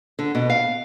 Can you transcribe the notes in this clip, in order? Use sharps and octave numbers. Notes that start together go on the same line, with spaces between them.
D3
B2
F5